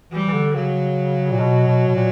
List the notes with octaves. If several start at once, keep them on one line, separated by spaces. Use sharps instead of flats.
E3 G3
E3
D3
C#3 F#3
A#2
B2
B2
B2
A#2